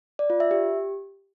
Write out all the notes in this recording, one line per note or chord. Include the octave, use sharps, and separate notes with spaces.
D5
F4
E5
G4